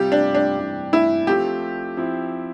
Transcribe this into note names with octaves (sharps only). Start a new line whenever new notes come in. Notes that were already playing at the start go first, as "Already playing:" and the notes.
Already playing: C3 G3 C4 F4 G4
D4
D4
C3 E3 G3 C4
E4
F3 A3 C4 F4 G4
F3 C4 E4